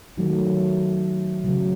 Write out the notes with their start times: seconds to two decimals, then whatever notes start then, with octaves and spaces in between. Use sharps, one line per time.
0.17 D#3 F#3 A3
1.44 C#3 F#3 A3